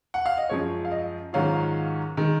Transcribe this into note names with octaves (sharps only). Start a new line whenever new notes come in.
F#5
F5
D#5
F#2 F3 G#3 C#5
F5
D#5
G#2 D#3 F#3 C#4 F4 F5
D#3 G#3